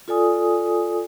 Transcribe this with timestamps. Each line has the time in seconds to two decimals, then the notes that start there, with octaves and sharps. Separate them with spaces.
0.08 F4 A4 D5 G#5 D#6